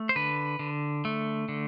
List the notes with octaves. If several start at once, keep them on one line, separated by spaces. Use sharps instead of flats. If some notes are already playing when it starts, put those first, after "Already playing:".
Already playing: A3
C5
D3 B4
D3
A3
D3